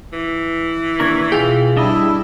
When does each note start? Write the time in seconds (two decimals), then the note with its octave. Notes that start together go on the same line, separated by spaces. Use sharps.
0.13 E3
1.00 D#2 D4 A#4 C#6 G#6
1.32 B2 F4 G#4 G5
1.77 G3 D4 E4 D#5